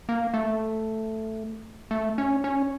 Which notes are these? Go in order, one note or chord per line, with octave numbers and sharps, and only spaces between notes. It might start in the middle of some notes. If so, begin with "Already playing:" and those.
A#3
A3
A3
C#4
C#4